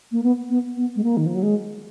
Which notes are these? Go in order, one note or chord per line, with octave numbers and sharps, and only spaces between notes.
A#3
B3
B3
B3
G#3
A#3
D#3
F3
F#3
G#3